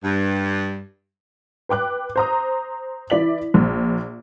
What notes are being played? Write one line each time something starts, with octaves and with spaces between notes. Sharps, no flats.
G2
B4 G5 D6 F#6
C5 A#5 D#6
E3 E4 D5 B6 F#7
A#1